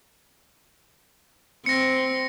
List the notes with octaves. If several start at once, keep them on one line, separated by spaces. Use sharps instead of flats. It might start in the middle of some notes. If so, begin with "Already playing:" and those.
C4 A#6 C#7